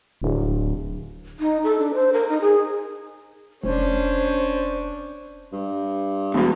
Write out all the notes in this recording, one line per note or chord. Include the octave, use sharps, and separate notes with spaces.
D1
D#4
A4
D4
C5
A#4
D#4
G#4
F1 C#4 D4 C5
G2
E1 E2 B2